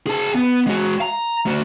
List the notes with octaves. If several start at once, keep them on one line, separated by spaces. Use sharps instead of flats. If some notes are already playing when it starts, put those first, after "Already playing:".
G#4 A5
B3
G#3 F#4
A#5
A3 F#4